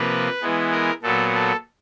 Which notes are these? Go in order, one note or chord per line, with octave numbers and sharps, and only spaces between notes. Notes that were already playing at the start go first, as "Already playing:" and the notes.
Already playing: C3 F3 A#3 B4
E3 G#3 B3
A#4
A#2 F#3 B3 A4
A4